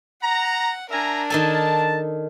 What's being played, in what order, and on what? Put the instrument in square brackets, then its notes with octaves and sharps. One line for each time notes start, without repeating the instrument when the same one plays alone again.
[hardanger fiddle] F#5 [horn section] A#5
[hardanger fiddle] D4 A#4 [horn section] E5 G#5 A#5
[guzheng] D#3 A4 G#5 [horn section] A5